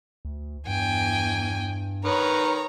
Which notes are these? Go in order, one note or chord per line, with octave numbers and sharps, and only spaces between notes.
D2
E2 G2 G5 G#5
D#3 B4 C#5 A#5